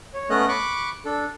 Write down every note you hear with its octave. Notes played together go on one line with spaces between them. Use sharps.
C#5
A3 B3 C#4 D#5 F#6
B5 C#6 D6 F#6
D4 A4